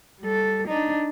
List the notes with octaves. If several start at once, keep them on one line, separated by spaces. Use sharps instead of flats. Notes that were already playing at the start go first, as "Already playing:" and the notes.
G3 A4
D4 D#4